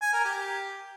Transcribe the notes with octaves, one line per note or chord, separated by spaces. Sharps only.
G#5
A#4
G4